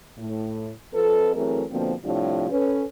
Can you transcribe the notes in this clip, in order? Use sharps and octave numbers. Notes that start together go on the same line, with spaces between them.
A2
F2 A4 B4
E3 F#3 A3 C4 G#4 A#4
B2 D3 F3 A#3 C4
A2 C3 F3 G3 D4 F4
C#4 A4 B4